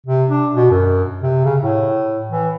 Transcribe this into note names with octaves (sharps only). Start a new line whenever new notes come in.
C3
D4
B2
F#2
C3
C#3
A2
E3